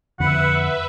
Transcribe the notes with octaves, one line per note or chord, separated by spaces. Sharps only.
F2 D3 F3 B4 E5 F#5